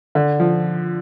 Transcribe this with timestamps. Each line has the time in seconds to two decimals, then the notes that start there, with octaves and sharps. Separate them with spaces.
0.15 D3
0.40 F3